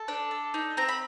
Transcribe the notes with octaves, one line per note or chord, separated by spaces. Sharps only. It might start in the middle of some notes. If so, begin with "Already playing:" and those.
Already playing: A4
D4
A4
D#4
C4 A#5
B5